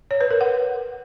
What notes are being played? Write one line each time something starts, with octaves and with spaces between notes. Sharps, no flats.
C#5
B4
A#4
F#5